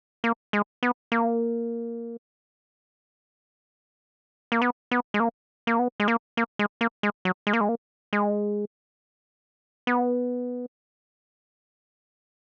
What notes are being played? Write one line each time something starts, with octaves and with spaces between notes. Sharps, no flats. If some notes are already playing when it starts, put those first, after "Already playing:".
A#3
G#3
B3
A#3
A#3
B3
B3
G#3
A#3
A#3
B3
G#3
A#3
A#3
G#3
A#3
G#3
F#3
G#3
A#3
G#3
A#3
G#3
B3